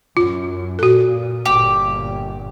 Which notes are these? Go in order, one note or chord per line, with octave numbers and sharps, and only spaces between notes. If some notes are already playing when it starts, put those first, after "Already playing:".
F#2 F4
A#2 F#4 A4
G1 A#2 G4